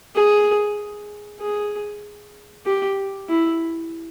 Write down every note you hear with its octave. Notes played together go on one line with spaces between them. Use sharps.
G#4
G#4
G4
E4